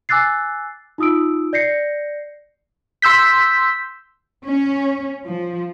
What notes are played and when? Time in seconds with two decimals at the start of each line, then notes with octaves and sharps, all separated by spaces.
0.09 G#5 D6 E6 F#6 A6 C7
0.98 D#4 F4 D#6 E6 D7
1.53 D5 G6 A#6 C7 C#7
3.02 C6 E6 G6 B6
4.45 C#4
5.25 F3